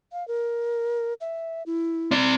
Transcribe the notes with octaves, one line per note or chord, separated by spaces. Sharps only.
F5
A#4
E5
E4
C4 D5